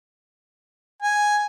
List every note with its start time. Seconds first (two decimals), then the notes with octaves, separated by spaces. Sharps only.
1.02 G#5